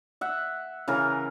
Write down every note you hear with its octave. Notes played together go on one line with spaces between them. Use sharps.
E5 F#5
C#3 E3 A#4